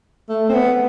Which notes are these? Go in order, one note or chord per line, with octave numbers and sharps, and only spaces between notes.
A3
C4
B3